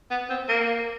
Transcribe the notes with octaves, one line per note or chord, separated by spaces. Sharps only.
B3
C4
A#3